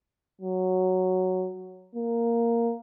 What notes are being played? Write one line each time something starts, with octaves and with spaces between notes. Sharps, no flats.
F#3
A#3